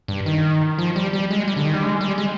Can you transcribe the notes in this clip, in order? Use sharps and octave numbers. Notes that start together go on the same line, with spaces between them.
G2
D#3
F3
G3
G3
G#3
G3
D3
D#3
G3
G#3
G3
G#3